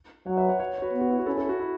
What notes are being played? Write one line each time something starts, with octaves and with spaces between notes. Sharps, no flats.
F#3 C#5 F#5
B4 E5
C#5 F#5
C#5 F#5
C#5
F#4 B4
B3
F#4
E4
F#4
C#4 E4 A4
E4 A4
F#4
E4